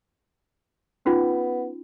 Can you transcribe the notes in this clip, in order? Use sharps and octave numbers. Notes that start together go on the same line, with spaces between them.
B3 C#4 D#4 F4